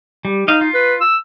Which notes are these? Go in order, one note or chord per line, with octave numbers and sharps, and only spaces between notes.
G3
D#4 D#5 F5
F4
B4
E6